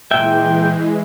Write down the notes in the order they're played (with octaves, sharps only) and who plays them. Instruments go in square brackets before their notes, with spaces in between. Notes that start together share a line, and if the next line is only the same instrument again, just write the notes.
[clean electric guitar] A#2 E5 [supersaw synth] E3 G#3 [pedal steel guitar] G5